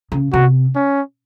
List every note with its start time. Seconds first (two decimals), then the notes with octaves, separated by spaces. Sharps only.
0.12 C#3
0.33 C3 F#4
0.76 C#4